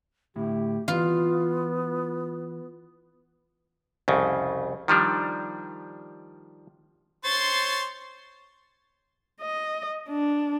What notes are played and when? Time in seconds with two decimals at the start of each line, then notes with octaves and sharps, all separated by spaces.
0.36 D2 A2 E4 G4
0.88 E3 B3 F4
4.08 C2 F2 C#3
4.88 D#3 F3 G3 D4
7.25 C5 C#5 C6 A6
9.41 D#5
10.09 D4